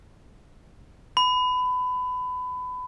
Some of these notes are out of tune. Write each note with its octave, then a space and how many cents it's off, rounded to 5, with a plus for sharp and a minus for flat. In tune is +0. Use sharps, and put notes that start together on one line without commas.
B5 +25